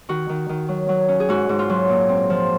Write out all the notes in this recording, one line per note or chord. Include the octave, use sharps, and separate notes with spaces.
D#3 F#4
D#3
D#3
F#3
F#3
C#4
G#4
G#2 F#4
G#2
F4
F#3
A#2
C4
F3